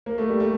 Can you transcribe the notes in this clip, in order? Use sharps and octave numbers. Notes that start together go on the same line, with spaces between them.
A#3
A3
G3
A3